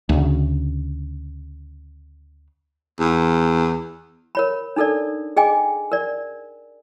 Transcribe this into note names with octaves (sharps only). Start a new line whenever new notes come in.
D2 C#3
E2
A#4 C#5 B5
D4 D#4 A4 A#4 D5
G#4 D#5 G5 G#5 D6
A#4 D5